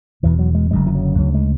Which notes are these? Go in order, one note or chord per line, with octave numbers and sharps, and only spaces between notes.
E1 E2 B2 E3
F#3
G#3
F#1 F#2 D3 G#3
E3
F#3
D2 C#3 F#3
G#3